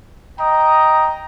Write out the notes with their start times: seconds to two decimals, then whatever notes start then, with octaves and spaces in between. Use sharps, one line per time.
0.40 D#5 G5 A#5